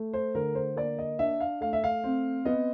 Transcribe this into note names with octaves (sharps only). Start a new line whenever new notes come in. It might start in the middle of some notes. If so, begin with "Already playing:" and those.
Already playing: A3
C5
D3 A#4
C5
A#3 D5
D#5
D4 E5
F5
A3 F5
E5
F5
C4
B3 D#5